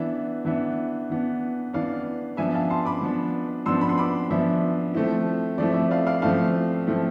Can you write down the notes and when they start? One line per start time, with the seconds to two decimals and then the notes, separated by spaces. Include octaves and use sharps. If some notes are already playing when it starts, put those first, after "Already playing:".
Already playing: E3 B3 D4 E5
0.45 E3 B3 D4 E5
1.10 E3 B3 D4
1.73 E3 B3 D4 D5 F5
2.37 F3 B3 D4 E5 G#5
2.54 F5 A5
2.70 A5 C6
2.85 B5 D6
3.01 F3 B3 D4
3.66 F3 B3 D4 C6 E6
3.81 B5
3.89 C6
3.98 B5 D6
4.30 F3 B3 D4 E5
4.94 F3 A3 C4 E4
5.58 F3 A3 C4 E4 D5
5.70 D5
5.74 E5
5.91 D5 F5
6.07 D5 F5
6.22 F3 A3 C4 E4 F5 A5
6.87 F3 A3 C4 E4